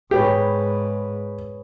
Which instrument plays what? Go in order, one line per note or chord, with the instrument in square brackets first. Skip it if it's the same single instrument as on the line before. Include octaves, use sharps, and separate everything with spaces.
[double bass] G#2 [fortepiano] G4 [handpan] G#4 B4 C#5